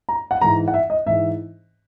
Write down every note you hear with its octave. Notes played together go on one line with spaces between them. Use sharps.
A#5
F#5
G#2 E3 A#5
F#5
E5
D#5
G#2 E3 E5